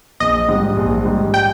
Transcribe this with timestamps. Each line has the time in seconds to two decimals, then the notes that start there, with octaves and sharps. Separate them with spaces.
0.20 A#1 D#5
0.48 G#2 G3
0.77 A#1
1.05 G#2 G3
1.34 G5